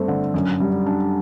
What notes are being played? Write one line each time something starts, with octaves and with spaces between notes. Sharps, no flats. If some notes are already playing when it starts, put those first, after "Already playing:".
Already playing: G2 A3 C4
D3
F#2
G3
D4